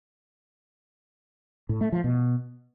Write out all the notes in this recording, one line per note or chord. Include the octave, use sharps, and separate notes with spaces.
A2
A3
F3
B2